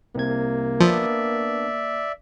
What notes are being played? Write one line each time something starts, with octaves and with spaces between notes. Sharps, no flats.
C2 C3 A#3 G#6
F3 B3 D4 D5 E5